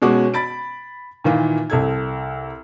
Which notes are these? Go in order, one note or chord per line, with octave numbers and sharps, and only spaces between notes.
B2 G#3 C#4 F#4 D6
B5 A6 D7
A#2 D#3 E3 A#3 F4
C2 A4 G#6